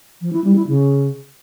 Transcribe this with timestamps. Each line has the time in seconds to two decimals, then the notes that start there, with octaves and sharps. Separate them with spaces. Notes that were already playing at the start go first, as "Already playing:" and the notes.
0.21 F3
0.33 E4
0.44 G3
0.56 E4
0.67 C#3